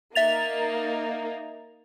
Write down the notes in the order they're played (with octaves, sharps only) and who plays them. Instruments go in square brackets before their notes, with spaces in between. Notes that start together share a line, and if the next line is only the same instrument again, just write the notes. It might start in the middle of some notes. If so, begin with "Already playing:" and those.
[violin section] A#3 D#4 [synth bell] E5 A6 F7